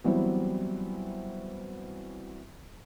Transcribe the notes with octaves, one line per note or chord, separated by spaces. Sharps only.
E3 F#3 G3 B3 C4